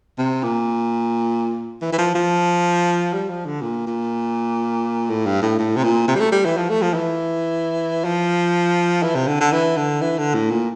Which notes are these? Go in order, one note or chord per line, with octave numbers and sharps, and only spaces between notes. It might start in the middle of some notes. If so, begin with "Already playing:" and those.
C3
A#2
E3
E3
F3
F3
G3
F3
D3
A#2
A#2
A2
G2
A2
A2
C3
A#2
C3
G3
A3
G3
E3
F3
A3
F3
E3
F3
E3
C3
D3
D3
E3
D3
E3
D3
A2
A#2